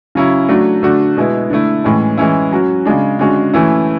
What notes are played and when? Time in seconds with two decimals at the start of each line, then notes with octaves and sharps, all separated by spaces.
0.15 C#3 F#3 C#4 E4
0.49 F#3 A3 D4 F#4
0.83 D3 A3 D4 F#4
1.17 B2 G#3 B3 E4
1.50 D3 A3 E4
1.84 A2 E3 G#3 C#4
2.18 E3 G#3 C#4 E4
2.52 F#3 C#4 F#4
2.85 C#3 G#3 D4
3.19 D3 G#3 C#4 F#4
3.54 E3 A3 C#4 E4